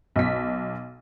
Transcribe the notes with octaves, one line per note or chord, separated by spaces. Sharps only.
B1 B6